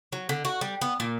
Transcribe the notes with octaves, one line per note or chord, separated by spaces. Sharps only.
F#3
D3
F#4
G3
B3
A#2